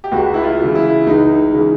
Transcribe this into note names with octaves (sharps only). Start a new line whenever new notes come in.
G4
C#2 F#4
E4
F4
C#3 E3
E4
C#2 D#4
C#3 E3